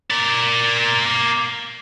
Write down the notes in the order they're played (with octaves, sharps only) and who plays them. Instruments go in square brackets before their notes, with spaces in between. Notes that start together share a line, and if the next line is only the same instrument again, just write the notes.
[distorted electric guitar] A#4 D5